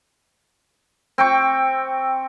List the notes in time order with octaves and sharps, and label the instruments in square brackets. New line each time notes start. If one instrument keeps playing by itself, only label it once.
[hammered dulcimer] C4 G5 C#6